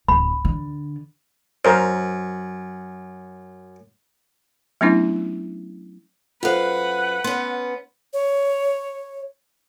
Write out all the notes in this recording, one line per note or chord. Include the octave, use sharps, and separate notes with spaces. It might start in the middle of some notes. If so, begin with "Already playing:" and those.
D1 B5
D3
F#2 A#4 C5
F#3 A3 B3 C#4 D4 E4
F#2 F4 A4 B4 C5 F5 F#5
B3 C#4 C6
C#5